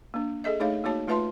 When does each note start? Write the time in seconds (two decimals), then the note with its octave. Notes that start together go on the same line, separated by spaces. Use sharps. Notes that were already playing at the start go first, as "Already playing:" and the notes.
0.14 A#3 D4
0.44 G#4 A4 D#5 E5
0.60 A3 D#4 G#4 C#5 E5 F5
0.84 A#3 D#4 F#4 C#5 A5
1.07 A3 F4 B4 E5 A5 C6